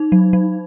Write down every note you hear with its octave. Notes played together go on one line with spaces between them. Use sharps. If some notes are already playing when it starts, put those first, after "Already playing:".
Already playing: D#4
F#3
F#3